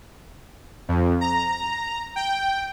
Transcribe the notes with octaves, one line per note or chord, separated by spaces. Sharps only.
F2
A#5
G5